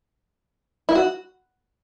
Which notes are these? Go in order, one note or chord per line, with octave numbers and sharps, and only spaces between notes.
E4
F#4